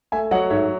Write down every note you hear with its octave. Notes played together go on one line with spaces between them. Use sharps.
A3 E5 G#5
F#3 D#5 F#5
G#2 C#5 E5